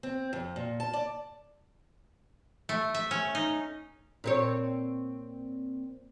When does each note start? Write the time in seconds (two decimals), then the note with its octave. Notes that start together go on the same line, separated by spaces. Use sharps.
0.03 C4
0.33 F2
0.56 A#2
0.80 A5
0.93 D5
2.69 A3
2.94 E5
3.11 C#4
3.35 D#4
4.24 A#2 C4 C#5